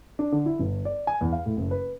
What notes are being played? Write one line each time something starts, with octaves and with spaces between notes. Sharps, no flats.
D4
D3
E4
G1
D5
G#5
E2
F5
A2
F#1
B4